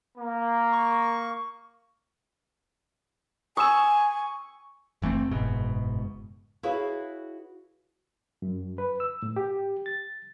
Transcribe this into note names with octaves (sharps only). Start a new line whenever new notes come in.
A#3
C#6
G#5 C#6 D#6 E6 E7
F#1 E3 A3 C4
F#1 G#2 B2
E4 F#4 G#4 B4 C#5 F5
F#2
B4
E6
A2
G4
A6